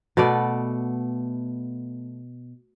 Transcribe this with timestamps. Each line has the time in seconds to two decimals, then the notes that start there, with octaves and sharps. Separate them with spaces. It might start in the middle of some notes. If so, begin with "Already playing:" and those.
0.17 B2 A3 B3 D5